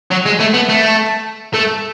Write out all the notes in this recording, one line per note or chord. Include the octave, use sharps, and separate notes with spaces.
F#3
G#3
A3
B3
A3
A3